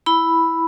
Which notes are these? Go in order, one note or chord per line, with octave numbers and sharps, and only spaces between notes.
E4 B5